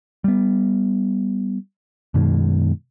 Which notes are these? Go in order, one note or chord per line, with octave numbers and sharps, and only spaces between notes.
G3 B3
F#2 B2 D#3 G#3